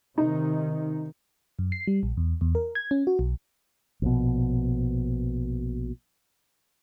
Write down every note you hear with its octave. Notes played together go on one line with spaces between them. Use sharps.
C3 D#3 D#4
F#2
C7
G3
A#1
E2
E2
A#4
G#6
C#4
F#4
B1
A#1 B2